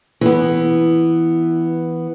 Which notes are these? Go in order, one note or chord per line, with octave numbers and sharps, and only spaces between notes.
E3 B3